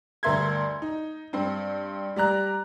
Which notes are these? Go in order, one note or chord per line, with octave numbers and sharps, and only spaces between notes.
D2 G2 A#4 E5 C6 G#6
D#4
G2 C4
G3 D5 A#5 F#6